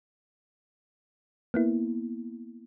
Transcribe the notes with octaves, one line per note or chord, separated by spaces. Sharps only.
A#3 B3 E4